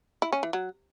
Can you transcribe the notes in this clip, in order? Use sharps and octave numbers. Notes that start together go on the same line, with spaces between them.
E4
C#4
E3
F#3